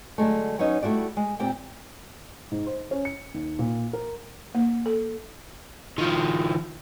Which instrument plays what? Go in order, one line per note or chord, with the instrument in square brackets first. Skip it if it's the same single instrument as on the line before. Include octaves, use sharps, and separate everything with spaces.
[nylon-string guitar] D3 F#3 G#3 A3
F#3 B3 C#4 D#4
G3 A3 E4 F#4 D5
G#3
A#2 C4 G4 G5
[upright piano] G#2
C5
C#4
C#7
D#2
A#2
A#4
[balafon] A#3
A4
[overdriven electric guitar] D#3 F3